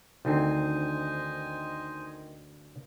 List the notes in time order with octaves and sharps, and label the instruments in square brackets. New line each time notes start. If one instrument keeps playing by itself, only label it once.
[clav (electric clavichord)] D2 C4 [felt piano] D#3 [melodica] C5 D#5 G#5